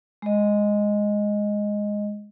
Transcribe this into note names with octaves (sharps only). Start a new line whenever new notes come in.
G#3 D#5